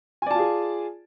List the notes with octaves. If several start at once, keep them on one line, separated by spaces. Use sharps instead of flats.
F4 G#4 D5 G#5 A5